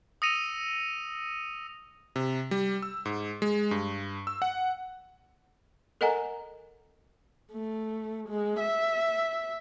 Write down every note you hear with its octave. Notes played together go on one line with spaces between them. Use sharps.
D#6 E6 A#6 C#7 D#7 F7
C3
G3
E6
G#2
G#3
G2
E6
F#5
A4 A#4 D#5 F#5 G#5 A#5
A3
G#3
E5